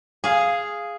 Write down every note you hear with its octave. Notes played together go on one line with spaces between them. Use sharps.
G#4 F5